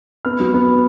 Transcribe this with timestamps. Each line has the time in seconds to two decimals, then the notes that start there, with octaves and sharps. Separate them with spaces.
0.25 B3 F6
0.40 F#3
0.54 B3